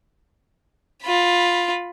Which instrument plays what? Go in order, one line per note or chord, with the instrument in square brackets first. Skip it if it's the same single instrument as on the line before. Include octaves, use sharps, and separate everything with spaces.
[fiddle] F4 B5